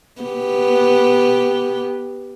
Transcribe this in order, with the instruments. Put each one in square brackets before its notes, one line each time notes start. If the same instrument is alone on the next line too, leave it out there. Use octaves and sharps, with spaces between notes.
[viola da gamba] B3 G4